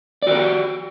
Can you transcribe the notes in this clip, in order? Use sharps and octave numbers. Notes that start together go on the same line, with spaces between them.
F#4 G4 A#4 D5